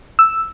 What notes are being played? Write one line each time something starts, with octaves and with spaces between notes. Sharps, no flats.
E6